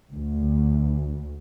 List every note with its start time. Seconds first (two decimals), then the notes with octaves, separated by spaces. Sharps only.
0.12 D2